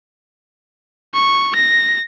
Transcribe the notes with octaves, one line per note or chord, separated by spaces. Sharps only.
C#6
A#6